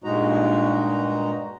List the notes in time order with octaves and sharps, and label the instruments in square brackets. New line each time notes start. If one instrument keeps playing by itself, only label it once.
[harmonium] G2 A#2 G#3 D#4 F#4 A#5